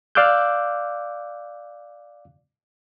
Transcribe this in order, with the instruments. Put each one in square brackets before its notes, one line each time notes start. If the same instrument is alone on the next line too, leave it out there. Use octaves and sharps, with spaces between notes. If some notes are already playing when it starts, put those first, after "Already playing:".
[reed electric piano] D5 F5 D6 E6 F#6 G6